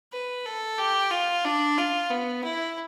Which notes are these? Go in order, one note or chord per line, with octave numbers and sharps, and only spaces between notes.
B4
A4
G4
F4
D4
F4
B3
E4